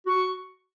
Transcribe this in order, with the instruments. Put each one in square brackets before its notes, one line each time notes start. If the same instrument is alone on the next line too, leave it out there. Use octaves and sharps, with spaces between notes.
[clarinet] F#4 [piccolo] C#6